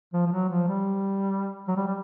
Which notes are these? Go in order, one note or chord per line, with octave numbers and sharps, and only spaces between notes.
F3
F3
F#3
F3
G3
F#3
G3
G3